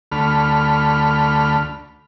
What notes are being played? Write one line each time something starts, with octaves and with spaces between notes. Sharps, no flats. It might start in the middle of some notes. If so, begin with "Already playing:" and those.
D2 A3 B5 F6